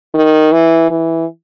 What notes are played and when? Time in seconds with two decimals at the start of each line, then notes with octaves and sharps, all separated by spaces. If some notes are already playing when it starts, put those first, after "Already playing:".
0.14 D#3
0.52 E3
0.91 E3